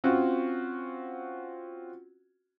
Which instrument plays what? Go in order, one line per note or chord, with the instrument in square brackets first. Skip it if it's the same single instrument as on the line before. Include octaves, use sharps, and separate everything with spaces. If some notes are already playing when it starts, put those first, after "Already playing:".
[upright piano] C4 C#4 F4 F#4